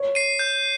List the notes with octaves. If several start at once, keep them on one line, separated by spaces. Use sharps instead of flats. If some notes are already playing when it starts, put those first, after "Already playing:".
Already playing: C#5
C7 D#7
G6